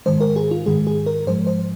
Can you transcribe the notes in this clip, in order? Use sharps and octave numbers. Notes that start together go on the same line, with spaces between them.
G#2 D#3 G#3 C5
A#4
G#4
F4
G#2 D#3 G#3 G#4
G#4
A#4
G#2 F3 G#3 C5
C5